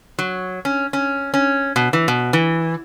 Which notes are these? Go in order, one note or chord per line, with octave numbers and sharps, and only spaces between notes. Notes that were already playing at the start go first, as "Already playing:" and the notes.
F#3
C#4
C#4
C#4
B2
E3
B2
E3